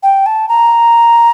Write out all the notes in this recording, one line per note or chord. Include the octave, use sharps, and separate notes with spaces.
G5
A5
A#5